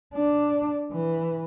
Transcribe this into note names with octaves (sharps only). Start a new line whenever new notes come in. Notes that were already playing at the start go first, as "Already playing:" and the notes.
D4
E3